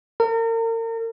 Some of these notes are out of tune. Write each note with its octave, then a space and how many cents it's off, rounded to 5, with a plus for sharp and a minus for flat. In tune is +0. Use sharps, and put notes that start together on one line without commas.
A#4 -40